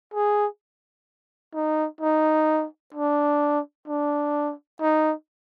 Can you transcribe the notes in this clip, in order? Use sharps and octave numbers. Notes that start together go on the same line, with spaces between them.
G#4
D#4
D#4
D4
D4
D#4